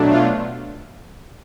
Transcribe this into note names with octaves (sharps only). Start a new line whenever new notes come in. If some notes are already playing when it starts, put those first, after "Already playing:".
Already playing: B2 F#3 A3 D4
F4